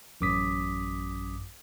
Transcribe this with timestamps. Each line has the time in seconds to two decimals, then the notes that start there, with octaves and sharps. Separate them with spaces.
0.21 A1 F#2 D6 D#6 B6